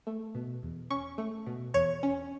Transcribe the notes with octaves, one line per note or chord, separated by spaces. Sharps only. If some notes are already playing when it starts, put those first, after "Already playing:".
A3
B2
E2
C#4 C#6
A3
B2
E2 C#5
C#4